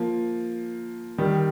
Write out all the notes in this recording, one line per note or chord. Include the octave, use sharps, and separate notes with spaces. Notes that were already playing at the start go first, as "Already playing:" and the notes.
Already playing: F3 A#3
D#3 G3